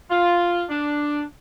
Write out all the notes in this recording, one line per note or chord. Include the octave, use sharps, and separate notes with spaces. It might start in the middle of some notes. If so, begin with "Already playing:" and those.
F4
D4